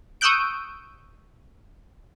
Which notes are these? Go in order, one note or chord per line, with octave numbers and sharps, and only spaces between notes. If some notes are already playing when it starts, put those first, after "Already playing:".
C#6 D#6 E6 F#6 G6 D7